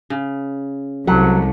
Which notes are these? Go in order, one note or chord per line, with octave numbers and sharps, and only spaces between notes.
C#3
C2 F#3 A3 F#5